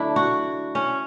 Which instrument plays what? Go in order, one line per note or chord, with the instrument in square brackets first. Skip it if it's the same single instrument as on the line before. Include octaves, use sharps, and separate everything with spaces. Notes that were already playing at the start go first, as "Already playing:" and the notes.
Already playing: [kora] D3 F#3 A3 D4 E4
F#4
C#4